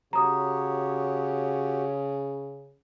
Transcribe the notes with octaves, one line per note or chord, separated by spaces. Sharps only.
C#3 F#4 G4 C#5 A#5 D#6